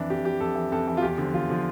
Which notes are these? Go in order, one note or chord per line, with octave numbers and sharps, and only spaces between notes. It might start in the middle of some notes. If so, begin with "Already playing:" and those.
Already playing: F2 E3 D4
F2 G4
E3 G4
F2 A4
E3
F2 A4
E3
F4
E2 G4
D3 F3
E2 F4
D3 F3